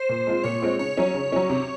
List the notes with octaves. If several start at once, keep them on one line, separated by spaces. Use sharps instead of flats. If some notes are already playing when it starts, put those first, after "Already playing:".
Already playing: C5
A#2
G#3 C4 F4
A#2 C#5
G#3 C4 F4
C#3 C#5
F#3 C#4
C#3
F#3 C#4
C3